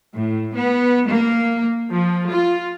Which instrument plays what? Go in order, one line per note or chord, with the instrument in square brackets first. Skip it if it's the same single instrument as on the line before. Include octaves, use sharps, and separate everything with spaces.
[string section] A2
B3
A#3
F3
F4